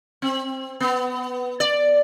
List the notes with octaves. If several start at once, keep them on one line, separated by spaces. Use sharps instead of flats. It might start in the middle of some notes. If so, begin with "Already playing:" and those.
C4
B3
D5